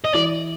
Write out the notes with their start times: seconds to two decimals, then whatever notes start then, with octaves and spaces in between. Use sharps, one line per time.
0.05 D#5
0.14 E3 D5